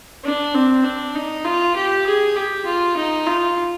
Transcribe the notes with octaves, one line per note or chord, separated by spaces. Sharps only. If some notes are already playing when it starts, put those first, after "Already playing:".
D4
C4
D4
D#4
F4
G4
G#4
G4
F4
D#4
F4